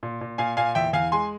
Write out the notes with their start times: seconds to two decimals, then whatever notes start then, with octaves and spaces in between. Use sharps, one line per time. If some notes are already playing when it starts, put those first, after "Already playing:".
0.03 A#2
0.21 A#2
0.38 A#2 F5 G#5
0.57 A#2 F5 G#5
0.75 E2 E5 G5
0.93 E2 F5 G#5
1.12 G#3 G#5 C6